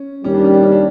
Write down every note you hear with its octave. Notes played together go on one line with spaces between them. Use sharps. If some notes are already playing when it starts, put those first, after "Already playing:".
Already playing: C#4
D#2 D#3 G3 C#4
D4
C#4
D4
C#4
D4